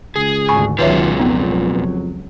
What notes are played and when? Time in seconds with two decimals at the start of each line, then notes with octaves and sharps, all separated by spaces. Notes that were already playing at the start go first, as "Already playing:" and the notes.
0.16 C#2 G#4
0.48 G#1 D2 G#5 B5 C#6
0.79 C#2 B2 D#3 F#3 F4 B4 C#5 E5
1.19 F2 B3 D#4